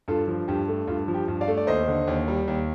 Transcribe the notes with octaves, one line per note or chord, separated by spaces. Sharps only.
G2 F4 A4
F3
G2 G4
A3
G2 F4
F3
G4
G2
D5 F5
A3
D5
D#2 C5 D#5
D3
D#2
G3
D#2